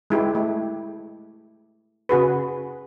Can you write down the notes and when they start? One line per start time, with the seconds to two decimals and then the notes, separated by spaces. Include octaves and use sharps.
0.10 G#3 E4 G4
0.35 A3
2.09 C#3 F#4 G#4 B4